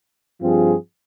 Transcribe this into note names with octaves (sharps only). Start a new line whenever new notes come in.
G2 F3 C4 F4 G#4